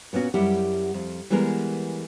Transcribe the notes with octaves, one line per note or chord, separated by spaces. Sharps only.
A#2 B3 C#4 F#4
F#2 G3 E4 G4 F#5
F2
E3 G3 G#3 B3 G#4 A#4